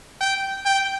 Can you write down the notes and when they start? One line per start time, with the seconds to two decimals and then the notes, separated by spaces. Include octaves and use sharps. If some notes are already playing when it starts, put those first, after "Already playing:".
0.21 G5
0.65 G5